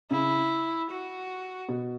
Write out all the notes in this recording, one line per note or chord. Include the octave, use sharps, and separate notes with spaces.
C#3 E4
F#4
B2